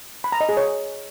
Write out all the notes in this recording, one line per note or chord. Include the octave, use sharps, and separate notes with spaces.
B5
A#5
D#5
G#4
C#5